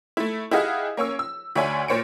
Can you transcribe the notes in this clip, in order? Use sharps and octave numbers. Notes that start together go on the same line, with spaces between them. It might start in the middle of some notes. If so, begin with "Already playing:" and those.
A3 E4
E4 G4 G#4 D#5 F5 F#5
A#3 C#4 C#5 E6
E6
D2 D4 C#5 E5 G#5 C6
A#2 C5 C#5 C#7 D7